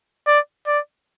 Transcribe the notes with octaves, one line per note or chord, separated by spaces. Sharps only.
D5
D5